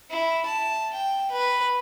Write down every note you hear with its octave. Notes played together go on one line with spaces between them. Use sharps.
E4
A5
G5
B4